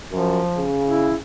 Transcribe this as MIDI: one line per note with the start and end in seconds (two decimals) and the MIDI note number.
0.12 0.41 42
0.12 0.67 53
0.57 1.20 49
0.87 1.15 64